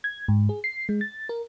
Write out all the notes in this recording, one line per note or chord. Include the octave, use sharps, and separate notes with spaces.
G#6
G#2
G#4
C7
G#3
A6
A#4